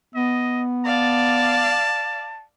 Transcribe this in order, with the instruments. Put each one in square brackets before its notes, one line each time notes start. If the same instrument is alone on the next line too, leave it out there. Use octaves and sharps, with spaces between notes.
[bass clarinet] B3 [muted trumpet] D#5
[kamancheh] D5 F5 [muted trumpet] A5